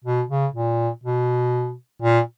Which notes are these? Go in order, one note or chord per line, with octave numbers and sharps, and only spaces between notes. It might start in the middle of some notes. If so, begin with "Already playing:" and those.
B2
C#3
A#2
B2
A#2